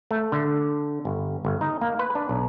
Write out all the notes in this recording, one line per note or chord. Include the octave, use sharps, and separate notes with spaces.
A3
D3
G1
G1
D#4
A#3
B4
D4
B1